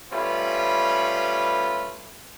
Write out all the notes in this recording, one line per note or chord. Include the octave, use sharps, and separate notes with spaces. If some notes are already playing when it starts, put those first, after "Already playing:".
G3 A3 C#4 F4 B4